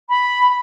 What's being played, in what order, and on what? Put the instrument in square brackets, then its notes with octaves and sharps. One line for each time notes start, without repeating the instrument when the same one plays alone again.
[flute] B5